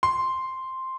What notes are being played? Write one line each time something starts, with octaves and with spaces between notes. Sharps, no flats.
C6